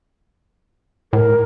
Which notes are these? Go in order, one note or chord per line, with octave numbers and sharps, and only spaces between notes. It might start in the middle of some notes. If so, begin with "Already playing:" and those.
A2 A#4